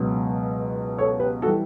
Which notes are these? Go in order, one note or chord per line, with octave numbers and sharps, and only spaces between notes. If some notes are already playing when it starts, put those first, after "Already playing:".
Already playing: C#2 B2 F#3
A4 C#5
G4 B4
F#4 A4
E3 G3